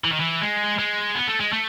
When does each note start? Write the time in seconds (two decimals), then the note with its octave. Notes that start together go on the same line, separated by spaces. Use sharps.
0.05 E3
0.12 D#3
0.20 E3
0.41 G#3
0.79 G#3
1.15 B3
1.28 A3
1.40 G#3
1.52 A3